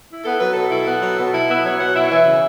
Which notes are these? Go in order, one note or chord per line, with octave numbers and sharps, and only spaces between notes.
E4
B3 A4
F#3 B4
B2 A4
E4
B3
F#3
B2
E4
B3 E5
F#3 C#5
B2 F#5
E4 E5
C#5
E3 E5
C#3